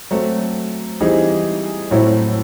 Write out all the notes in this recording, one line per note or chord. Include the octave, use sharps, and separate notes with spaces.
F#3 A3 C4
E3 G3 C4 D#4 G#4
A2 F#3 A3 C4 E4